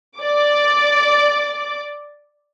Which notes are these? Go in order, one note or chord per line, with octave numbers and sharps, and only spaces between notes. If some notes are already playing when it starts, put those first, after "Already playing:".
D5 D6